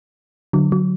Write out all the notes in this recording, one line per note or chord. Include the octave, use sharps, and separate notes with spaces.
D3 F#3
F#3